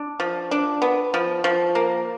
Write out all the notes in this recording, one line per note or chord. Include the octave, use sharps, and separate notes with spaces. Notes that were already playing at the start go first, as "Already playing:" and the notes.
Already playing: D4
F3
D4
B3
F3
F3
A#3